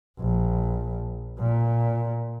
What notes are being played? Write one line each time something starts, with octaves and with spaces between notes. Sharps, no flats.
A#1
A#2